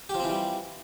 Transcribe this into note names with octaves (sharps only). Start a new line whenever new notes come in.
E3 F3 G3 C4 G4